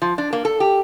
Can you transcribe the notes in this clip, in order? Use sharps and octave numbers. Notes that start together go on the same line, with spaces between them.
F3
D4
A#3
A4
G4